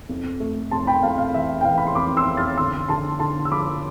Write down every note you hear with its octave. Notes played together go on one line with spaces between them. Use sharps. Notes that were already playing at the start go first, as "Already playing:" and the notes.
F2
A3
F2 A5 C6
G5 B5
F2 F5 A5
F5
E3 E5
G5
E3 F5
B5
C6
F2 B5 D6
C6 E6
F2
F6 A6
D3 C6 E6
D3 A5 C6
D3 A5 C6
E6
F3 B5 D6